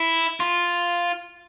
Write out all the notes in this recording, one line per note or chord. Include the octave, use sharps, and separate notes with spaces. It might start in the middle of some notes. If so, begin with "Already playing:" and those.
Already playing: E4
F4